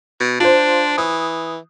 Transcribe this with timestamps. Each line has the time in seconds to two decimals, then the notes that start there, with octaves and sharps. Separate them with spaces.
0.20 B2
0.40 D4 F4 C5
0.97 E3 D#6